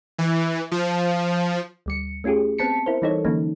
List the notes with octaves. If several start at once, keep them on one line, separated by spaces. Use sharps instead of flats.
E3
F3
D2 G3 C#7
A3 C#4 F4 G4 G#4
B3 C4 A5 B6 C#7
E4 A#4 C5
E3 G3 D#4 E4 A4 C#5
D3 E3 F#3 A#3 C#4 D#4